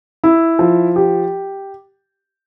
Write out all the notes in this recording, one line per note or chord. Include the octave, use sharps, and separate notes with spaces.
E4
F3
G4